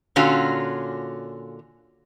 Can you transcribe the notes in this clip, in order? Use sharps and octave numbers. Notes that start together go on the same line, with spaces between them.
A#2 D3 C#4 F4 F#4